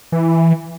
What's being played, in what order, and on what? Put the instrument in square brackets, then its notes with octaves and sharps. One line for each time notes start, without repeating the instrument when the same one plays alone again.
[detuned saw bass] E3